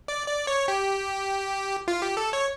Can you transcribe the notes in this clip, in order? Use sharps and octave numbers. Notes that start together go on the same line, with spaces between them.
D5
D5
C#5
G4
F4
G4
A4
C#5